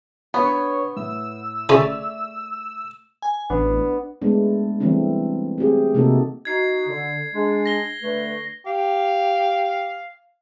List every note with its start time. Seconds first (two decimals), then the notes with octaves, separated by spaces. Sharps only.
0.34 B3 D4 B4 C#5
0.96 A2 E6
1.69 C#3 A3 C#4 C#5 D5 E5
3.22 G#5
3.50 A1 B3 D4
4.22 G#3 A3 B3 D4
4.80 E3 G3 A3 C4 D4
5.58 A3 C4 G4 G#4
5.94 C3 A3 A#3 D#4 F#4 A4
6.45 D#4 F#4 G#6 C7
6.87 D3
7.32 G#3 D4
7.66 A#6 G7
8.02 D3 A3 B4
8.66 G4 F5